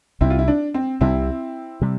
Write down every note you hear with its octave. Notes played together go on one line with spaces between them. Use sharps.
C2 C3 G3 C4 E4
F4
E4
D4
C4
C2 C3 G3 C4 E4
C3 G3